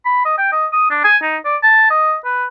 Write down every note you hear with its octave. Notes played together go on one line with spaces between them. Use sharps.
B5
D#5
G5
D#5
D#6
D4
G#5
D#4
D5
A5
D#5
B4